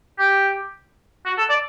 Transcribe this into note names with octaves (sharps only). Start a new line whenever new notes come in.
G4
F#4
A4
D5